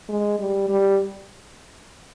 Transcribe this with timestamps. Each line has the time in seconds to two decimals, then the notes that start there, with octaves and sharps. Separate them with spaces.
0.09 G#3
0.39 G3
0.69 G3